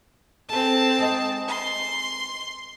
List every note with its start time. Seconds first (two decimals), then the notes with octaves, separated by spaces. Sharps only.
0.49 C4 G#4 A4 A5
0.99 G#3 D#4
1.48 C6